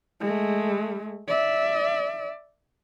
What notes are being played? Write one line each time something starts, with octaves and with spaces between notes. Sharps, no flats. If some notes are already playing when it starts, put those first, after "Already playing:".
G#3 A3
D5 E5